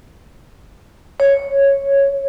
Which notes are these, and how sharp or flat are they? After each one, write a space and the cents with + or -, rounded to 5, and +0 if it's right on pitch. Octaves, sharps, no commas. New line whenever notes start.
C#5 -5